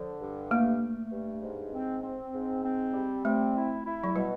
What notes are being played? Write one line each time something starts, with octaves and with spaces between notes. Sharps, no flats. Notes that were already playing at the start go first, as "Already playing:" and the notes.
Already playing: D3 F3
G2
A3 A#3
A3
G2
G#2
C4
C4
G#2
C4
G3
A3 C4
E4
E4
F#3
B2 G3